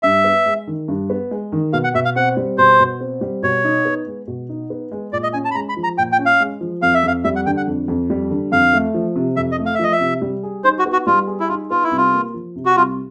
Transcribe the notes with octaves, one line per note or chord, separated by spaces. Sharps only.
G2 E5
B3
G#3
D#3
G2
B3
G#3
D#3
B2 F5
F#5
B2 E5
F5
C4 F#5
G3
B2 C5
B2
C4
G3
B2 C#5
D#4
B3
G#3
B2
D#4
B3
G#3
A#2 D5
D#5
C#4 G#5
A5
B5
G#3 A#5
B5
F3
A#5
A#2 G5
G5
C#4
F5
G#3
F3
F2 F5
E5
F2 F5
G3 E5
F#5
D3 G5
F#5
F2
F2
G3
D3
F2 F5
A3
F3
C3
F2 E5
D#5
A3
F5
E5
F3 D#5
E5
C3
G3
G#4
D#4 C5
F#4
B3
F#4
G3 F4
G#4
E4
D#4 F4
B3 F4
E4
C2
F4
A#3
F3
C3
F#4
C2 F4